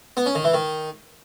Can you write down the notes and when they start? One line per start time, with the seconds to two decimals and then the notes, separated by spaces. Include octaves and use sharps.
0.17 B3
0.26 C#4
0.35 D#3
0.44 E3
0.54 D#3